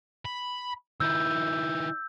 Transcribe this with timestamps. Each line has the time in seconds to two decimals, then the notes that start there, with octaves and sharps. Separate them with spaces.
0.25 B5
1.00 D#3 E4 E6 G6